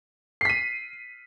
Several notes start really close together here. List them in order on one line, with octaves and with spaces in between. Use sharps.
C7 B6 D#7